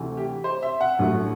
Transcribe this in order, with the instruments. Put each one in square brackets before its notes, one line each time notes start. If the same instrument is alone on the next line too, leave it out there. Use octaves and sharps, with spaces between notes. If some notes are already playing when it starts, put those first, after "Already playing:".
Already playing: [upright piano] D2 C3 E3 A3
G4
C5
E5
F#5
A1 G2 D3 F#3 A3